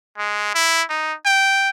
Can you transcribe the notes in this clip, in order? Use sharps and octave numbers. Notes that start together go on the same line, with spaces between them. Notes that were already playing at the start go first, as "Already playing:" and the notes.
G#3
E4
D#4
G5